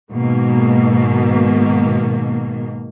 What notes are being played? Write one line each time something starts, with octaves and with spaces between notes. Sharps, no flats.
G#2 B2 D#3 A#3